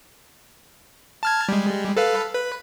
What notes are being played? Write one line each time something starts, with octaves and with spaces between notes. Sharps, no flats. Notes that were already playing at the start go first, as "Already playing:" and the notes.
A5 F6 G#6
G3 G#3
A4 B4 F5
B4